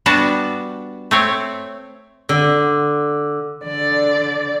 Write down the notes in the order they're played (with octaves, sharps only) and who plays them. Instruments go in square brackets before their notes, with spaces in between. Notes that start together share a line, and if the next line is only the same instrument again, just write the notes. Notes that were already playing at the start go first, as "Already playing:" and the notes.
[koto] G3 B3 D4 F#4 A5
A3 C4 C#5
[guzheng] D3
[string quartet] D3 D5